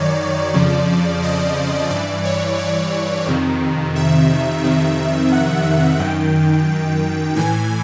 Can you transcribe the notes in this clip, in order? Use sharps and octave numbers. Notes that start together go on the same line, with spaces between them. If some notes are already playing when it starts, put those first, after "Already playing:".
Already playing: F#2 D#3 C#5 D5
F2 C#3 F3
D#5
G2 E3 D5
C#5
D5
F2 C3 D#3
E5
F2 C3 D#3
F#5
F#2 D#3 G5
A2 E3 G#5